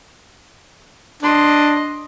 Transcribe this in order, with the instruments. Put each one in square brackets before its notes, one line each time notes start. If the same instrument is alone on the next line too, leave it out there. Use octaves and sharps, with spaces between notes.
[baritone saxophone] D4 [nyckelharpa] D#5 C6